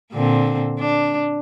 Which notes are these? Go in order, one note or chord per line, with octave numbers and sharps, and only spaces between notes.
A#2 D3 C4
D4